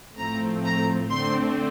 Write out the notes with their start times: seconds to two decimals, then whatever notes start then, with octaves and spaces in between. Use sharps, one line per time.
0.17 A2 F3 A3 C4 A#5
0.65 A#5
1.11 D3 A3 C4 C6